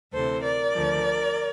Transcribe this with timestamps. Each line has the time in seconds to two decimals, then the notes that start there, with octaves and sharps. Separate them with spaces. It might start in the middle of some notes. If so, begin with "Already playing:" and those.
0.12 D2 C3 E3 A4 C5
0.43 A#4 D5
0.74 D2 D3 F3